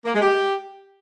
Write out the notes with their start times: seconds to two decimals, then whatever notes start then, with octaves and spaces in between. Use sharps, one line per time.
0.05 A#3
0.13 G#3
0.22 G4